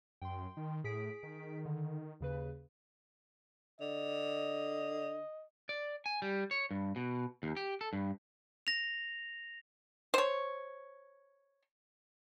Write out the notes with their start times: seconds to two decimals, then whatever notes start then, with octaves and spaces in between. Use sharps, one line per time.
0.22 F#2 G5 C6
0.57 D#3
0.84 A2 G#4 B6 D7
1.23 D#3
1.65 D3
2.20 D#2 C#3 B4
3.81 D3 D#5
5.69 D5
6.06 G#5
6.22 G3
6.51 C#5
6.71 G2
6.96 B2
7.43 D#2
7.57 G4
7.81 A4
7.93 G2
8.67 A#6 F7
10.14 C5 C#5